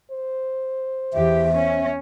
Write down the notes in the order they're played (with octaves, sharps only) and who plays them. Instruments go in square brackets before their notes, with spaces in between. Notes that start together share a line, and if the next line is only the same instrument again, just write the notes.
[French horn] C5
[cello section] E2 G4 [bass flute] E5
[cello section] C#4